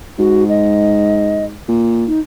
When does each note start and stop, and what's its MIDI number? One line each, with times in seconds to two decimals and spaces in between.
0.19 1.60 44
0.19 0.44 66
0.49 1.44 75
1.69 2.06 46
2.07 2.20 63